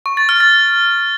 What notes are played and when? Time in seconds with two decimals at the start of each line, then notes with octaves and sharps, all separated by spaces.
0.06 C#6
0.17 A6
0.29 F6
0.40 A6